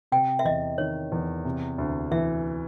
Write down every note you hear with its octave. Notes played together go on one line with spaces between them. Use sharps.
C3 G5
E5
E2 D#5
D#3 C#5
E2
C3
D2
E3 E5